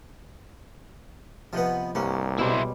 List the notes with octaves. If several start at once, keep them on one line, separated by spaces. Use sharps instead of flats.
C3 F3 B3 D#5 F#5
C2 G2 A#3 C#4 F#5
B2 G3 G#3 E4 C5